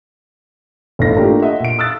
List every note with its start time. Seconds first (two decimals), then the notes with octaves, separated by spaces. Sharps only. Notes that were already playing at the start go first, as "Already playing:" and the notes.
0.99 G1 A2 E3 D#4 A#6
1.16 A3 A#3 D4 F4 G4
1.42 D#5 E5 F#5
1.60 A#2 D7
1.79 D#6 E6 F#6 A6